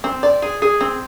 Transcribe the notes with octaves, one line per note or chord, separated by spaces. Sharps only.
C4
D5
G#4
G#4
C4